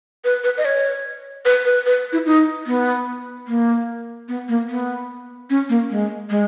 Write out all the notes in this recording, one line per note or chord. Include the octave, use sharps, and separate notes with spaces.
B4
B4
D#5
C#5
B4
B4
B4
E4
D#4
B3
A#3
B3
A#3
B3
C#4
A#3
G#3
G#3